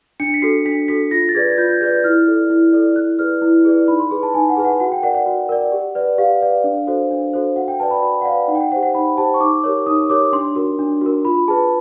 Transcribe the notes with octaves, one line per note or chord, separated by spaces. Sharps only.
D4 C#7
B6
F#4 A4 C7
D4 B6
F#4 A4 B6
F4 A#6
A6
G#4 B4 D5 G#6
G#6
F4 G6
G#6
G#4 B4 D5 G6
E4 F6
A4 D5
E4
A4 D5
E4 F#6
G#4 B4 D5 F6
E4
G#4 B4 D5
D#4 B5
C6
G#4 B4
A5
D#4 G#5
F#5
G#4 B4
F#5
F#4 F#5
G5
A#4 D5 F#5
F#5
F#4
A#4 D5
G4
B4 D5
G4 F5
B4 D5
D4
F#4 A4 C5
D4
F#4 A4 C5
F#4 F#5
G5
B4 D5 A5
B5
F#4 B5
F#5
B4 D5 F5
D#4 F#5
G5
F#5
G4 C5 F#5
F#5
D#4 B5
G4 C5 A5
C#6
D#4 D6
G4 A#4 C#5
D#4 D#6
G4 A#4 C#5 D6
D4 C6
F#4 A#4
D4
F#4 A#4
F4 B5
G#4 B4 A5